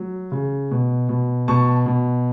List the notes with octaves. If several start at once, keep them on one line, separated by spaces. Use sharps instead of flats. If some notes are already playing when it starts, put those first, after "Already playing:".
Already playing: F#3
C#3
B2
B2
B2 A5 C#6
B2